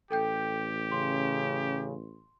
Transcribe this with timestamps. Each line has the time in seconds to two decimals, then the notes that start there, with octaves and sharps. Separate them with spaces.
0.11 A1 G4 A4 G5 G6
0.91 C#3 C6